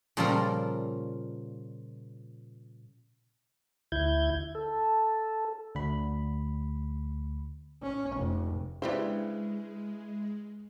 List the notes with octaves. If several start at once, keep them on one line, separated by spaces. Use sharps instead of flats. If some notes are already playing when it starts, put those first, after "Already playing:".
A#2 C#3 F3 G3 A4 A#4
D2 E4 G6 G#6
A4
D2 B5
C#4
F1
C#3 G#3 B3 D4 E4 G4 C5